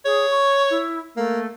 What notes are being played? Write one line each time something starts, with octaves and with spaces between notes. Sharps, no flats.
G#4 C#5
C#6
E4
A3 A#3